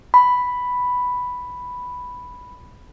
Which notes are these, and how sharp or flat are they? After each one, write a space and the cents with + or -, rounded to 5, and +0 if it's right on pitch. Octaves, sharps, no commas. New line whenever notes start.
B5 +0